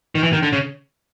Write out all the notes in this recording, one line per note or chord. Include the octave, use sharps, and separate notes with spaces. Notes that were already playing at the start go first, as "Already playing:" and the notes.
D#3
E3
D#3
D3
C#3